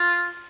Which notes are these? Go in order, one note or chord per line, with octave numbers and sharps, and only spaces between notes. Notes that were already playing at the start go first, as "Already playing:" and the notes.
Already playing: F4